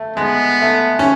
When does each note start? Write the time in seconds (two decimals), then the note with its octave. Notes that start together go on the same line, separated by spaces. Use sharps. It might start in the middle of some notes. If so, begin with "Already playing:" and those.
Already playing: A3
0.16 G#3 B3
0.62 A3
0.99 C#4